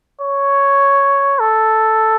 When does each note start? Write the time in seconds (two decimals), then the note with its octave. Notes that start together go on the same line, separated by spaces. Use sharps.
0.21 C#5
1.40 A4